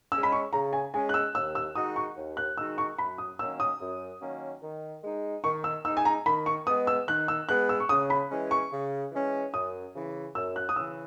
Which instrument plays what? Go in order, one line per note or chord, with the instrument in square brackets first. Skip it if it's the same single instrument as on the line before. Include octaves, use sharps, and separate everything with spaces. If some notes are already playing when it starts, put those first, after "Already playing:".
[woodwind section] G#3 C#4 [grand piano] E6
[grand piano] B5
C#6
[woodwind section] C#3 [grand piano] A#5
[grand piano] G#5
[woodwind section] G#3 [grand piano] G#5
[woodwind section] C#4
[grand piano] F#6
E6
[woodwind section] D#2 [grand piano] E6
[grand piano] E6
[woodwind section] D#3 G#3 D#4 F#4 [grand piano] D#6
[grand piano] C#6
[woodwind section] D#2
[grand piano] F#6
[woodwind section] D#3 G#3 D#4 F#4 [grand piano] E6
[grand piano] C#6
[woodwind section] F#2 [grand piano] B5
[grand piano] D#6
[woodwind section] D#3 F#3 A#3 C#4 [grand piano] E6
[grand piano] D#6
[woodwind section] F#2
D#3 F#3 A#3 C#4
D#3
G#3 D#4
[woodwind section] D#3 [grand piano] C#6
[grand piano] E6
[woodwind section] D#4 [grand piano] E6
[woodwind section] G#3
[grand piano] G#5
A#5
[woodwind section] D#3 [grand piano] B5
[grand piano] C#6
[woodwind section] B3 [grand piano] D#6
[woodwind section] G#3
[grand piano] E6
[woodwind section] D#3 [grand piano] F#6
[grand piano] E6
[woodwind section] G#3 B3 [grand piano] F#6
[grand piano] E6
C#6
[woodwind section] C#3 [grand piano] D#6
[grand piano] B5
[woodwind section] E3 G#3 C#4
[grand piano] C#6
[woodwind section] C#3
E3 G#3 C#4
[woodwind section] F#2 [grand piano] D#6
[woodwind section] C#3 E3
[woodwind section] F#2 [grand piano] E6
[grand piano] F#6
D#6
[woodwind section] C#3 [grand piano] E6
[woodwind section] E3